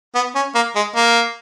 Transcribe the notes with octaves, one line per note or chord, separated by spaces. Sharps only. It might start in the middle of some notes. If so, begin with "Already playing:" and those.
B3
C#4
A#3
G#3
A#3